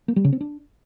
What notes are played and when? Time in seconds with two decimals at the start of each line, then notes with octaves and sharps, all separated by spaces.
0.08 A#3
0.16 G3
0.24 C#3
0.33 C4
0.41 D4